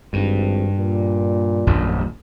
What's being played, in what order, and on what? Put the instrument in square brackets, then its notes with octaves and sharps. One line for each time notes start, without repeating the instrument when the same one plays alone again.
[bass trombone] G#1 [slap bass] G2
[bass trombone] A#2
[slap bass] D#1 A#1 F#2